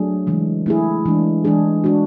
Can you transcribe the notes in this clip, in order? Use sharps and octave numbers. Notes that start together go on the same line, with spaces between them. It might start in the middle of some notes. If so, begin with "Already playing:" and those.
Already playing: F#3 A3 D4 G#4
C#3 E3 G#3
A3 E4 G#4
E3 G#3 D4
E3 G#3 D4 G#4
G#3 D4 F#4